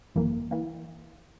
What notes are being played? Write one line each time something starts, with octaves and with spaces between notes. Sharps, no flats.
G#1 F#2 E3 A#3
E3 A#3